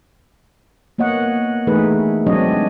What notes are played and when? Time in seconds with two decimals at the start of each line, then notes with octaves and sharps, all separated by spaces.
0.98 A#3 B3 C#5 D#5 F#5
1.67 E3 A3 D#4 G#4 A#4 B4
2.27 F#3 G#3 C4 D4 C#5 D#5